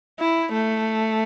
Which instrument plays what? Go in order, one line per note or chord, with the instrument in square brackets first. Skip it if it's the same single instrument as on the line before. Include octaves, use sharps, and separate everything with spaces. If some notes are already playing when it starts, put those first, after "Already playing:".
[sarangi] E4
A3